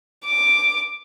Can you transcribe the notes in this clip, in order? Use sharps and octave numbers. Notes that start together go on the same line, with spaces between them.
D6